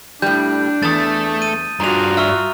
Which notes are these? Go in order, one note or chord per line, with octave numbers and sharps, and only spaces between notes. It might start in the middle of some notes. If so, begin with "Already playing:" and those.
A2 G3 D4 G6
E2 A3 D#6 A6
D#7
G2 F4 F#4 G#4 A#5 F7
E5 C#6 E6 F6